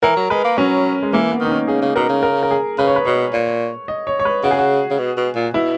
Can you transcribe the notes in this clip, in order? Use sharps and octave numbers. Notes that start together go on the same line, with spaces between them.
E3 A#4
F#3
G#3 B4
A#3
F#3 C#4
G#3
E3 A#3
B3
D#3 D#4
C#4
C#3 G#4
C#3
B2 A#4
C#3
A#4
A#4
G#4
C#3 B4
C#5
B4
B2 C#5
A#2
D#5
C#5
C#5
B4
C#3 F#4
G#4
F#4
C#3
B2
B2
A#2
B2 E4